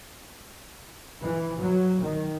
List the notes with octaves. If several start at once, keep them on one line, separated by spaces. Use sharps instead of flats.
E3
F#3
D#3